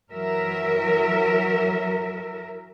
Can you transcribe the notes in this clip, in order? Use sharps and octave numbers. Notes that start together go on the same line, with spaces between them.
E3 F#3 A#4 E5